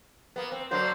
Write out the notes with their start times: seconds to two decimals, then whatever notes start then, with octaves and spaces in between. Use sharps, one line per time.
0.36 A#3 B3
0.52 C4
0.71 D3 F#3 A#3 C5